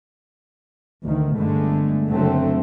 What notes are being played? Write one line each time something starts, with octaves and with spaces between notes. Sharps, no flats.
D2 D#3
G1 D3 G#3 A3
F#1 D3 F#3 A3 C4